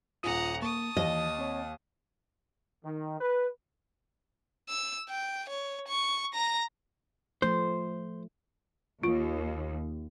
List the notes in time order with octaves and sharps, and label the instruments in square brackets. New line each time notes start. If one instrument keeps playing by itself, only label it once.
[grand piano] D#1 G#5 D#7 [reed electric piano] F4 D#6 [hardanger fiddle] F#5 A#5
[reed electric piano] A#3 [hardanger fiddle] A5 D#6 [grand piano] C#6
[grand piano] D#2 [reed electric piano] E3 [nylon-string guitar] D#5
[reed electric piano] C4 C#5
[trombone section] D#3
B4
[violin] E6
G5
C#5
C#6
A#5 A#6
[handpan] F3 A3 [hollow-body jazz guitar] C5
[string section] D#2 [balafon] F4